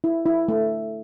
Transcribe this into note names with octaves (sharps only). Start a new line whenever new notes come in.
E4
E4
A3